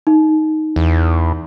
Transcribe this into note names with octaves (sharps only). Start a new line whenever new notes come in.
D#4
E2